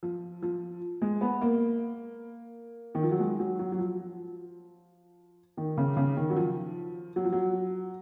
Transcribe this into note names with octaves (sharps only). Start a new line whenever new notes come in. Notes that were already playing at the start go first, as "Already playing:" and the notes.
F3
F3
G#3
B3
A#3
D#3
F3
F#3
G#3
F#3
F#3
F#3
F3
D#3
C#3
C#3
D#3
F#3
F3
F#3
F3
F#3